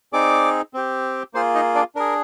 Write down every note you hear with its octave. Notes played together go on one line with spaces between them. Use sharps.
C4 D#4 G#4 D5 D6
C4 G4
A#3 F4 G#4 C5 C6
D#4 D#5
D4 D5
D4 G#4 A#4